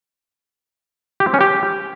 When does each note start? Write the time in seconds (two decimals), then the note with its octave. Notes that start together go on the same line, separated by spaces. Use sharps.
1.20 G4
1.27 C4
1.34 C#4
1.41 G4